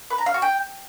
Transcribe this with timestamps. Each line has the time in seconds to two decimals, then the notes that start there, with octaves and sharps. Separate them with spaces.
0.10 B4
0.18 A#5
0.26 F5
0.34 F#4
0.42 G5